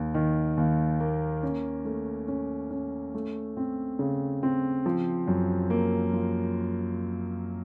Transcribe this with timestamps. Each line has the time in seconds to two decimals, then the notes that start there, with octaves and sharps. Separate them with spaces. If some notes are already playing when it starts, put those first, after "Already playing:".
Already playing: D#2
0.14 D#3
0.57 D#2
1.00 A#3
1.43 C#4
1.85 A3
2.28 C#4
2.71 C#4
3.14 A3
3.57 C4
3.99 C#3
4.43 C4
4.86 F3
5.27 F#2
5.70 A#3
6.13 F3